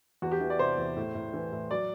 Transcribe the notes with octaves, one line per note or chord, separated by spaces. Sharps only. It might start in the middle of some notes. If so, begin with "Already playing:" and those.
E2 F#4
G4
E3
D5
C3 C5
E2
A2
A2
E3
A2
F#3 D5